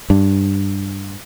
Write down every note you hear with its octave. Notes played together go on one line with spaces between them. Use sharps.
G2